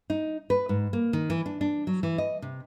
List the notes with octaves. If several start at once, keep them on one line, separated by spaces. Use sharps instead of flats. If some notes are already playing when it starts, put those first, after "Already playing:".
D#4
B4
G#2
A#3
D#3
E3
D4
D4
F#3
E3
D#5
C3